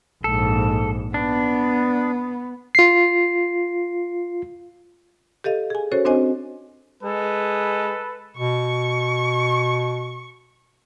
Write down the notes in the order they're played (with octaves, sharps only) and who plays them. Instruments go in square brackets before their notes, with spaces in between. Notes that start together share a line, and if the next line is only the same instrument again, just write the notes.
[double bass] A#1 G#2 [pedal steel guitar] A4
[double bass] B3 [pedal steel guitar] D4
[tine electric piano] F4 C7
[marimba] G4 A4 D#5 F5
G#4 G#5
C#4 F#4 A4 C5 C#5
C4 D4 F#4 C5 D#5 G#5
[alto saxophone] G#3 [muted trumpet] A4 [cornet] B4
[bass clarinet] B2 [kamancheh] C#6